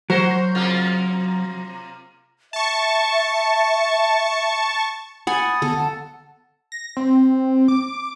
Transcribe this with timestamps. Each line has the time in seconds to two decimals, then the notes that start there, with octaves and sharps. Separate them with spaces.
0.10 F#3 F#4 A#4 C5
0.55 C3 A#3 F4
2.53 E5 A5 C#6
5.27 F#5 G#5 B5 D#6 A6
5.62 D3 B3 A4
5.77 F#5 A5
6.72 A#6
6.97 C4
7.68 D6